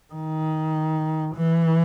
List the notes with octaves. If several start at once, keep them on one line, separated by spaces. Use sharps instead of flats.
D#3
E3